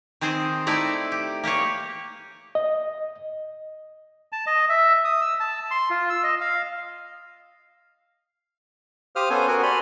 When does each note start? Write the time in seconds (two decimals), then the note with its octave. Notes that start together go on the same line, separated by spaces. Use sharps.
0.21 D#3 C4 G#4 C5
0.67 A3 D#4 E4 D5 A#5
1.12 G4
1.44 A#3 G4 G#4 C#5
2.55 D#5
4.32 A5
4.47 D#5
4.69 E5
5.05 D#6
5.21 E6
5.40 A5
5.71 C6
5.90 F4
6.10 E6
6.24 D#5
6.41 F5
9.16 G4 C5 F5 D#6 F6
9.30 B3 C#4 A4 C5 G#5
9.48 B3 F#4 A#4 F#5 G#5
9.63 F#4 D5 G#5 B5 C6 F6